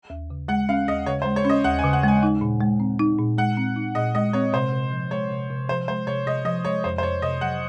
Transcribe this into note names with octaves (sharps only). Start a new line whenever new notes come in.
D#2
C#3
G#3 F#5
C#4 F5
D#2 D#5
C#3 C#5
C5
G#3
C#5
C#4 D#5
D#2 F#5
G#5
C#3
F#5
G#3 G#5
D#4
A#2
G#3
C4
D#4
A#2
G#3 F#5
C4
D#4
A#2 D#5
G#3 D#5
C4 C#5
C3 C5
C3
F3
G#3 C#5
C3
C3
F3 C5
G#3 C5
C3 C#5
C3 D#5
F3 D#5
G#3 C#5
F2 C5
C5
F2 C#5
C3 D#5
F#3 F#5